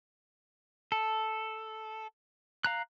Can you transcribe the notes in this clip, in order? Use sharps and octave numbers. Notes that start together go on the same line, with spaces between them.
A4
F5 A#5 F#6